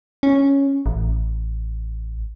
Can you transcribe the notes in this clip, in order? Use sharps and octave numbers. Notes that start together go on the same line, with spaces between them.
C#4
A1